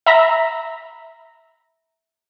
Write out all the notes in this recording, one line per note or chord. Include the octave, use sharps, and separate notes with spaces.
E5 A#5 B5 A#6